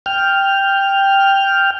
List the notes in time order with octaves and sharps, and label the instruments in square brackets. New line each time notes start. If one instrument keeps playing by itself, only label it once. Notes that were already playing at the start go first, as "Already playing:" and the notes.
[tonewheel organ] G5 F6